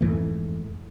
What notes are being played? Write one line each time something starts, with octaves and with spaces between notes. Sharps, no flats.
F2 G#2 E3 A3